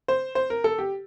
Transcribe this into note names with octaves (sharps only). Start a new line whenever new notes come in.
C5
C5
A#4
A4
G4